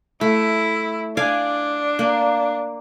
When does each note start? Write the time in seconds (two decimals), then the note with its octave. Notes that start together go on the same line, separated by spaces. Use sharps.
0.21 A3 E4
1.17 D4 D5 F5 G#5
1.99 A#3